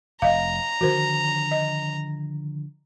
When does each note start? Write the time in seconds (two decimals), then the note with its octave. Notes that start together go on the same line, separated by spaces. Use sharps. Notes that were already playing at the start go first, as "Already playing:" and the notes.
0.22 F1 D#5 F5 A#5
0.81 D3 D#3 F3 F#4 A#4 C5
1.51 D#5